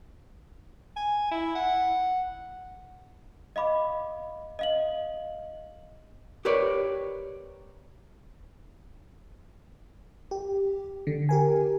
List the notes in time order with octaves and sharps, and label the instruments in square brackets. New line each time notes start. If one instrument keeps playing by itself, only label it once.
[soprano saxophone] G#5
E4
F#5
[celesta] D#5 F5 B5 D6
D#5 F5 F#7
[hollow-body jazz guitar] G4 A#4 B4 C#5 D5
[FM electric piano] G4
D3
G4 A#4 G#5